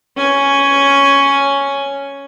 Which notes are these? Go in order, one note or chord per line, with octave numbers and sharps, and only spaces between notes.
C#4 G#5